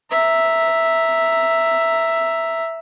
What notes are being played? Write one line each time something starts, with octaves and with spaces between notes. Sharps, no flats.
E5 A#5